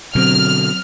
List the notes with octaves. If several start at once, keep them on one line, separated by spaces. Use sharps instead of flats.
B2 D3 F#3 C4 F6